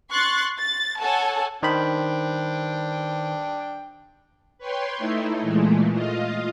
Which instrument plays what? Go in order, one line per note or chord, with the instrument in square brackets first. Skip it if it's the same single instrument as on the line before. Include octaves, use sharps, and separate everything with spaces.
[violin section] C6 C#6 F#6 A6
A6
A4 C#5 F#5 G#5 A5
[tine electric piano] D#3 C5 B5 [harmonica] D4 G5
[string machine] B4 C#5 G5 C6
A3 D#4 E4
A#2 E3 G#3 A3
F4 D#5 F5